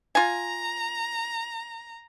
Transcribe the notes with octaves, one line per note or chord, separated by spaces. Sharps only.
F4 G#5 A#5